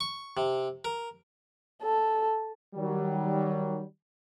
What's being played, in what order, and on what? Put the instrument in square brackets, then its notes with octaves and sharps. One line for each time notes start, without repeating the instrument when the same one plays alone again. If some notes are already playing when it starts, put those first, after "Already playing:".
[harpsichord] C#6
C3
A#4
[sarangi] A4
[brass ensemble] D#3 F#3 G3